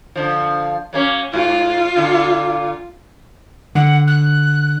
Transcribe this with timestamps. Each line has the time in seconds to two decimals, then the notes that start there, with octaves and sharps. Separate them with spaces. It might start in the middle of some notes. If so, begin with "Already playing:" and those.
0.15 D3 F3
0.93 F#3 A#3 C#4
1.34 G#2 F4
1.96 A#2 D3
3.75 D3 F#5
4.07 F#6